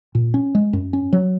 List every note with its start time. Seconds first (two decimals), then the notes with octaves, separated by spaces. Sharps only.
0.15 A#2
0.34 C#4
0.55 G#3
0.73 F#2
0.93 C#4
1.13 F#3